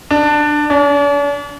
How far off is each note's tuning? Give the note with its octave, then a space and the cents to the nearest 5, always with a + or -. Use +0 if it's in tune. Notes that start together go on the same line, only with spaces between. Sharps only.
D4 +15
D4 -45